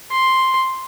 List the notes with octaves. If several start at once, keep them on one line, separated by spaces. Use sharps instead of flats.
C6